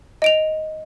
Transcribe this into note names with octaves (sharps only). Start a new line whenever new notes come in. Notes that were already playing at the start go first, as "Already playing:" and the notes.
D#5 D7 F7